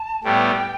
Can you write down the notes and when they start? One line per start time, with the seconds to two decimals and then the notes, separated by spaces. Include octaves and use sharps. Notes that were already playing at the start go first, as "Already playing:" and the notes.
Already playing: A5
0.23 A2 G3 B3 G5